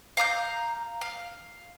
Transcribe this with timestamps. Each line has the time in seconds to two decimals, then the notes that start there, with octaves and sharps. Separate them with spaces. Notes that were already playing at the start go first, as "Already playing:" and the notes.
0.17 F5 A#5 D#6 G6
1.01 F5